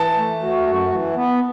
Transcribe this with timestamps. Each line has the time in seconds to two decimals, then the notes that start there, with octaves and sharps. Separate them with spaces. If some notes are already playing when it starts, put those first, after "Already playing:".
Already playing: E3 A5
0.17 A3
0.42 F#4
0.67 F#2
0.92 E3
1.16 B3